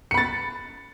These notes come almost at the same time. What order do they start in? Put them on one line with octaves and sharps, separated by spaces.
C#7 B5 A6